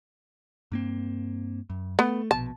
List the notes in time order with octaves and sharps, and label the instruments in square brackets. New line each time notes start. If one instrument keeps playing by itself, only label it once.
[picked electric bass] G2 A#3 C4
F#2
[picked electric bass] A3 [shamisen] B3
[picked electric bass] A#1 B2 [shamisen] A5